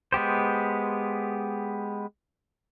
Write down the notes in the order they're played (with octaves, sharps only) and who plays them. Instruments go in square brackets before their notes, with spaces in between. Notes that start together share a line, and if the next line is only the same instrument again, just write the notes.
[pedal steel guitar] G#3 B3 G4 C5